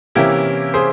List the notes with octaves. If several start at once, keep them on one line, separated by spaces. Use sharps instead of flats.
C3 E3 A#3 C#4 E4 G4
G#4 C5